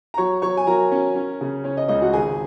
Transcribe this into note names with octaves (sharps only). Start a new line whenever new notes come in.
A#5
F#3 C#5 C#6
F#3 C#5 C#6
G#5
F#3 A#4 A#5
C#4
C#4
C#3
C#4 C#5
D#5
C#2 D#5
F#4 F#5
G#1 G#4 G#5